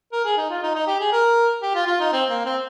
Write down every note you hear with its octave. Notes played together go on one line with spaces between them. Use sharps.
A#4
G#4
D#4
F4
D#4
D#4
G4
G#4
A#4
G4
F4
F4
D#4
C4
A#3
C4